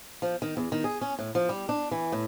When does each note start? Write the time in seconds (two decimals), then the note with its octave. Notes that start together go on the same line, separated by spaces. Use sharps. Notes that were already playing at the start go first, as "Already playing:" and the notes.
0.22 F3
0.42 D#3
0.57 E2
0.72 D#3
0.84 G#4
1.01 C#4
1.19 A2
1.35 F3
1.49 G3
1.69 D4
1.91 E3
2.12 A2